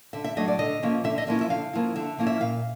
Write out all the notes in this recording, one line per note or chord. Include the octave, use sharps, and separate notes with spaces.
D3 E5
E5
F#3 A3 D4 D#5
D5
D3 D#5
F3 A#3 C#4 E4
D3 E5
D#5
F3 A#3 C#4 E4 E5
E5
D3 F5
F3 A#3 C#4 E4
D3 E5
F3 A#3 C#4 E4
E5
A#2 F5